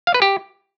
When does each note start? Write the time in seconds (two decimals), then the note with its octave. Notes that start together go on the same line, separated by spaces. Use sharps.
0.07 F5
0.14 B4
0.22 G4